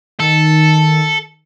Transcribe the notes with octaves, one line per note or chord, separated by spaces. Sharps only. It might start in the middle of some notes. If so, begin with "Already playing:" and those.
D#3 A4